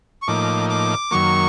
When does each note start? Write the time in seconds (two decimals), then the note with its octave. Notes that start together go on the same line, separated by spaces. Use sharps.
0.22 C#6
0.28 A2 F3 A#3 D#4 D6
0.70 D6
1.11 F#2 D#3 F#3 A#3 C#6